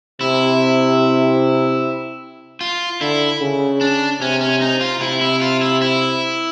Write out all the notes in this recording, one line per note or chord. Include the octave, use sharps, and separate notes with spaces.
C3 E4
F4
D3 E4
C#3
D4
C3 C#4
C#4
D#4
F4
C3 E4
E4
F4
E4
E4